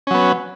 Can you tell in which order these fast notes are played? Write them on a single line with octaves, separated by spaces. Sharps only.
C#4 F#3 B3